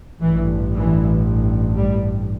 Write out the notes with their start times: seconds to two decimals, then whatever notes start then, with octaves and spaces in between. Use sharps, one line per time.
0.22 A1 G2 E3
0.74 E3
1.77 G3